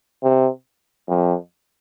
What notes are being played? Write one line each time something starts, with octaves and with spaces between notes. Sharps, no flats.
C3
F2